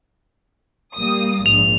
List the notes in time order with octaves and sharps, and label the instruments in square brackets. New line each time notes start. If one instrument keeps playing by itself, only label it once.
[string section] G3 A#3 D#6
[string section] A#1 G#2 [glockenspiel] F7